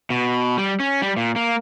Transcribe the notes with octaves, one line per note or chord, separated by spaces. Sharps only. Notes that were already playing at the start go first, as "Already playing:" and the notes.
B2
G3
C#4
G3
A#2
A#3